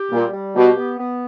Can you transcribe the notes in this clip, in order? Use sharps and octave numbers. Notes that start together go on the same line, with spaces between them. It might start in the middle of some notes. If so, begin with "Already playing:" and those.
Already playing: G4
A#2 G3
G3
B2 G4
B3
B3